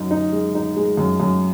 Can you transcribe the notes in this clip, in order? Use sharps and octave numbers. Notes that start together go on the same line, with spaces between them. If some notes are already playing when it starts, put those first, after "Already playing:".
Already playing: F#2 D#4
D#4
G#3
D#4
G#3
F#2
F#2